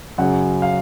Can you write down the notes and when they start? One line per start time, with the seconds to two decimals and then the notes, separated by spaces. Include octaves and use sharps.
0.18 F#2 C#3 F#3 F#5
0.62 F5